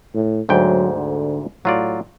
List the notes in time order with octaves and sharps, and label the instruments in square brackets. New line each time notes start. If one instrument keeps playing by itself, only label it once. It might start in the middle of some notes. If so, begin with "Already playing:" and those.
[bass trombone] A2
[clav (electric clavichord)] D2 G#2 G5 [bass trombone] F#3
[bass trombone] D3
[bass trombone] A2 [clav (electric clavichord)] F#3 F4 D5